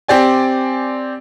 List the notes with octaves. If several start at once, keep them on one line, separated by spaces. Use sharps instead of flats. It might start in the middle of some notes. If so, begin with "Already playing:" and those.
C4 G4 D5 G#5